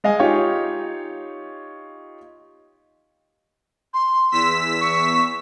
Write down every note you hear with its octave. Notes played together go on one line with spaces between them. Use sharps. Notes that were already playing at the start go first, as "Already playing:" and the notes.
G#3 D#5 F5 G#5
D#4 F4 G4 C#5 F5
C6
E2 E6 B6
C#6